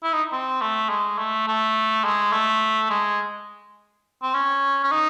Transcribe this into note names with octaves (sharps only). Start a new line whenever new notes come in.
E4
D#4
C4
A3
G#3
A3
A3
G#3
A3
G#3
C4
C#4
C#4
D#4